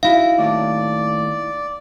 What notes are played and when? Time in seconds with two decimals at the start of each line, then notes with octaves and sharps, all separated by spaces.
0.03 D#4 E4 F#4 F5
0.38 D#2 A2 D5